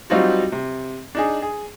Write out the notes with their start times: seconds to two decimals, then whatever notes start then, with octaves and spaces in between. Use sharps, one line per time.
0.10 F#3 G3 C4 D#4 F4 F#4
0.52 C3
1.15 D4 D#4 G#4
1.42 G#4